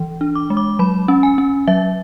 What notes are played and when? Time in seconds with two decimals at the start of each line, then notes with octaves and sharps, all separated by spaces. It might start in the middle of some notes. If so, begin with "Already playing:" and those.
Already playing: E3
0.21 D4
0.35 D6
0.50 G#3
0.57 D6
0.79 F#3 B5
1.08 C#4
1.23 G#5
1.38 C#4
1.68 F#3 E5